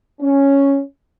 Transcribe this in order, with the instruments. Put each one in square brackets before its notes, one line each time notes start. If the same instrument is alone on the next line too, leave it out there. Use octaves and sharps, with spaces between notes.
[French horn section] C#4